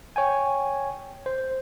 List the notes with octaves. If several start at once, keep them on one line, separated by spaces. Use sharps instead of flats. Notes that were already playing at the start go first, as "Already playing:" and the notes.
C#5 G5 G#5
C5